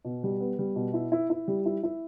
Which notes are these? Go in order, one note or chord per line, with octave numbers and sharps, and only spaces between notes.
B2
G3
B3
G3
B2
E4
E4
E4
G3
E4
E4